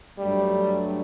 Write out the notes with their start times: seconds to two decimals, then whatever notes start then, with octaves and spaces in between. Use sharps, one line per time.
0.18 G2 F#3 G3 A3 D4